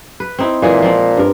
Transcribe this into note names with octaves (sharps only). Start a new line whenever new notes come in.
B4
C4 D#4 E4
A#2 E3 G#3 G#4
F3 C4 D#4
G2 A#4